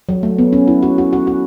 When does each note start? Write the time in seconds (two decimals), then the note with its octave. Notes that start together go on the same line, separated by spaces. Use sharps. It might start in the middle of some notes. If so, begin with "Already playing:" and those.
0.09 F#3
0.23 A3
0.38 B3
0.53 C#4
0.68 E4
0.83 F#4
0.98 F#4
1.13 F#4
1.27 F#4